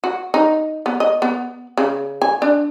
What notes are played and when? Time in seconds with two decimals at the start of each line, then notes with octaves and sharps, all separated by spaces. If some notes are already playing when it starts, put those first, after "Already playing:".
0.04 F#4
0.34 D#4
0.86 B3
1.00 D#5
1.22 B3
1.78 C#3
2.22 G#5
2.42 D4